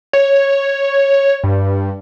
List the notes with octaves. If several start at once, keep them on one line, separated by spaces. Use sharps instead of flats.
C#5
G2